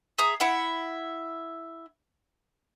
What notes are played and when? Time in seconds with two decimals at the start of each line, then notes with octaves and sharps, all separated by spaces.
0.18 G#4 E5 A#5 D#6
0.40 E4 E5 F#5